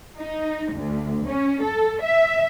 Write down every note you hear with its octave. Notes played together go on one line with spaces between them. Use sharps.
D#4
D2
C#4
A4
E5